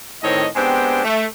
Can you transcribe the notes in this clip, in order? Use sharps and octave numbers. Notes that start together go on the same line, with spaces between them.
A2 D#3 C4 C#5 D#5
G#3 B3 C4 D4 G4 G5
A3